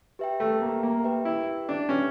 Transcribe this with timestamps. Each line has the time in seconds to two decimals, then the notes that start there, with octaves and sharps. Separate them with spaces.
0.19 G4 B4 E5 G5
0.40 A3
0.62 A#3
0.83 A#3
1.04 G4 B4 E5 G5
1.25 E4
1.69 D4
1.89 C#4 G4 B4 E5 G5